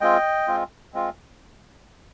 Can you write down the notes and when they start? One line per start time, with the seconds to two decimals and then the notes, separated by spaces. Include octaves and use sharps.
0.01 G#3 C4 F4 D#5 G5
0.48 G#3 C4 F4
0.94 G#3 C4 F4